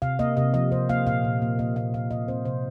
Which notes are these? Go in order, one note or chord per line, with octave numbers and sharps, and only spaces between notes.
C3 F5
A#3 D#5
C3 D#5
F3 D#5
C3 C5
A#3 F5
A#2 F5
A#2
A#3
A#3 D#5
A#2 F5
A#2 F5
C3 D#5
C4 C5
C3 C5